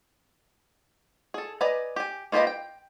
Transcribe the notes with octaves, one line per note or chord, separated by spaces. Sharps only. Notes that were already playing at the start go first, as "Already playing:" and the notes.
G#4 A4
B4 D5 D#5 G#5 A#5
G4 G#5
A#3 F4 G4 B4 D#5
G5